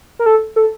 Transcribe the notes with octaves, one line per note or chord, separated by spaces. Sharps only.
A#4
A4
A4